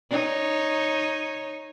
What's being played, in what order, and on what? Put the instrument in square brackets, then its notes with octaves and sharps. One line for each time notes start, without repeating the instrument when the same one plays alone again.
[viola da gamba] D#4 C#5